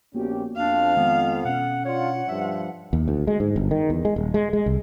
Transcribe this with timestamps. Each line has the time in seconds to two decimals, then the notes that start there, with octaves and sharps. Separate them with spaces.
0.15 A#1 A#3 B3 C#4 F#4 G4
0.56 F2 D4 F5
0.97 D#3 G#3 B3
1.45 B2 C#4 F#5
1.85 D4 F4 C#5 F#5
2.28 G2 F3 E5
2.93 D#2
3.08 D2
3.27 G#3
3.40 G#2
3.56 G1
3.71 D#3
3.90 E2
4.05 G#3
4.16 D#1
4.34 G#3
4.53 G#3
4.66 C2